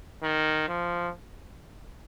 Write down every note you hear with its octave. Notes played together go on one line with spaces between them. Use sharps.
D#3
F3